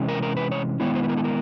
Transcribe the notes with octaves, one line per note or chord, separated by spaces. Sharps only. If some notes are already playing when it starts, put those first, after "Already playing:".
Already playing: C3 E3 G#3 C#4
A#4
A#4
B4
C#5
D#3 G#3 B3 E4 C#5
C5
B4
A#4
A4
A#4